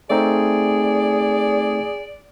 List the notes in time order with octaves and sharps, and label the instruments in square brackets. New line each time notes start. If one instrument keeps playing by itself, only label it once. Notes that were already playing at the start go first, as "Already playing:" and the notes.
[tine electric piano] A3 C4 D#4 [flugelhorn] G#4 [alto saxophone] D5